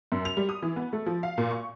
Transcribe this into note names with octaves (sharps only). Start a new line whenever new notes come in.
F#2
F7
G3
D#6
E3
B3
A3
F3
F5
A#2
C#6